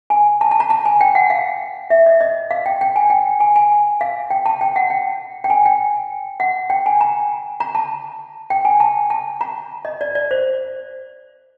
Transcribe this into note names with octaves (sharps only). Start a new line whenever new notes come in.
G#5
A5
A5
A#5
A5
G#5
G5
F#5
F5
E5
D#5
D#5
F5
G5
G5
G#5
G5
G#5
G#5
F5
G5
A5
G5
F#5
G5
G5
G#5
G5
F#5
G5
G#5
A#5
A#5
A5
G5
G#5
A5
A5
A#5
D#5
D5
D5
C5